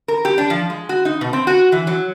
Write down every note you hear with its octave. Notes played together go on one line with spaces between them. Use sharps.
A#4
G4
D4
F3
G#3
F#4
D#4
B2
C4
F#4
E3
F#3